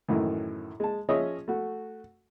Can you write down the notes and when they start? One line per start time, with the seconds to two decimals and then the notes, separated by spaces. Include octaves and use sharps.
0.08 F#2 A2 D#3 E3
0.80 G#3 A5
1.09 F3 C#4 G#4 C#5 D#5 E5
1.48 A3 F#4